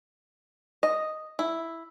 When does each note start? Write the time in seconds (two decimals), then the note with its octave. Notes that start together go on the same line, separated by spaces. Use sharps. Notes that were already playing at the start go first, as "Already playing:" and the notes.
0.83 D#5
1.39 E4